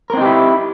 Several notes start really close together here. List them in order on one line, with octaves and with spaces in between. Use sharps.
A#4 C4 D#4 G4 E4